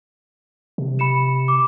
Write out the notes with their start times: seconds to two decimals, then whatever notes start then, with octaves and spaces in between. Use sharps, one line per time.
0.78 C3
0.99 B5 C#7 E7
1.48 D6